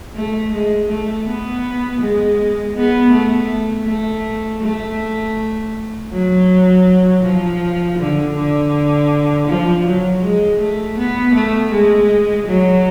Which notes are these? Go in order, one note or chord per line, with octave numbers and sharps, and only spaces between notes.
A3
G#3
A3
B3
G#3
B3
A3
A3
A3
F#3
F3
D3
D3
F3
F#3
G#3
A3
B3
A3
G#3
F#3